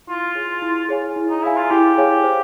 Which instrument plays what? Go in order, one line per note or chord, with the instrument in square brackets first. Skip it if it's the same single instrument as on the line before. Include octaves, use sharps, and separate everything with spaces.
[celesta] E4 [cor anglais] F4
[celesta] G#4 C#5 F5 G#5
E4
G#4 C#5 F5 G#5
E4
[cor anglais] D#4
[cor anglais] E4 [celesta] G#4 C#5 F5 G#5
[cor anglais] F4
[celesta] E4 [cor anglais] G4
[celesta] G#4 C#5 F5 G#5
C5